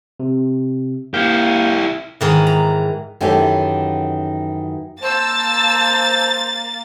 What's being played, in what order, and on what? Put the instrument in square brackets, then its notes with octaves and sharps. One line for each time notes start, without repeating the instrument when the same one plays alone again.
[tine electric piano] C3
[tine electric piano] A#3 F5 G6 [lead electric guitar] E4 G4
[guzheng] G#2 D#3 E3
A#5
[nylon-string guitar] F#2 D#3 E3 C#4 G4 A4
[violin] A#3 A6 [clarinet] C5 [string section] A5 E6